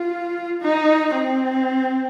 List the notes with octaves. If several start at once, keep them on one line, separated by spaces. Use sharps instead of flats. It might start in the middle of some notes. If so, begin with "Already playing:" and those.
Already playing: F4
D#4
C4